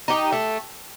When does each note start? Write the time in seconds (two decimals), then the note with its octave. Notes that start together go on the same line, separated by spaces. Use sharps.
0.08 D#4 G4
0.32 A3